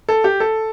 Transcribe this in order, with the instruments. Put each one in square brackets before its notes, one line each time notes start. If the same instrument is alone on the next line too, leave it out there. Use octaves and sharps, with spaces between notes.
[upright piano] A4
G4
A4